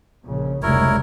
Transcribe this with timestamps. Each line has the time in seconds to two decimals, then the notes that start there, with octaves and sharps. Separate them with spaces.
0.25 A#1 C#3
0.63 F1 C#2 G3 G#3 E4 A#4 C#5